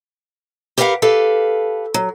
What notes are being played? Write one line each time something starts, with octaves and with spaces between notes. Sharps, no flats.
G4 A#4 B4 D#5 F5 F#5
G4 A4 B4 F5
F#3